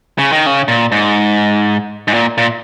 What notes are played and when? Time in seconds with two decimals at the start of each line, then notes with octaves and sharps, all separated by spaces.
0.18 C#3
0.32 D#3
0.46 C#3
0.68 A#2
0.92 G#2
2.08 G#2
2.14 A#2
2.38 A#2